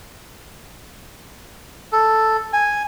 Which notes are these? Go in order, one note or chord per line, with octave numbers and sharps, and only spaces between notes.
A4
G#5